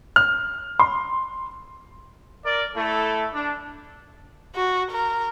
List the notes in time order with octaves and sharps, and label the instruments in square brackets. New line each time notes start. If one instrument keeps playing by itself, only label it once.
[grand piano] F6
C6
[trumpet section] A#4 D5
A3 E4 A4
D4
[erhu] F#4
A#4